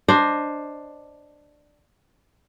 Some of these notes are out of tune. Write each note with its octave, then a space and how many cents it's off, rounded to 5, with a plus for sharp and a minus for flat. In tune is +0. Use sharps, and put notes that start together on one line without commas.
D4 +5 C5 +10 D#5 +0